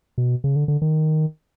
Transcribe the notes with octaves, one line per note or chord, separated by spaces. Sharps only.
B2
C#3
D3
D3
D#3